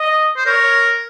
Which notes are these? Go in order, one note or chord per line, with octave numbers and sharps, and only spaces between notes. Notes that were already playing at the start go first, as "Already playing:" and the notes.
Already playing: D#5
C5
A#4 C#5